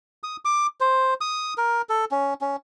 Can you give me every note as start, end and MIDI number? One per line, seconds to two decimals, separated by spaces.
0.23 0.37 87
0.45 0.67 86
0.80 1.14 72
1.21 1.54 87
1.58 1.82 70
1.89 2.05 69
2.11 2.34 61
2.41 2.56 61